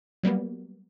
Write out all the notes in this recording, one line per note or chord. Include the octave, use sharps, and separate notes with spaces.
F#3 G3 A#3 B3